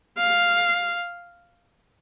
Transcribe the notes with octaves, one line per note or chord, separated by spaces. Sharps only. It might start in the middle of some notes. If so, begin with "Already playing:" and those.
F5